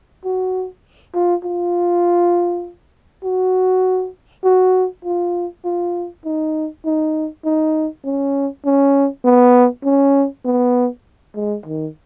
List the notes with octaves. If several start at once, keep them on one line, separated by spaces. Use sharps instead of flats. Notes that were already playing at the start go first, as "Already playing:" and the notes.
F#4
F4
F4
F#4
F#4
F4
F4
D#4
D#4
D#4
C#4
C#4
B3
C#4
B3
G#3
D#3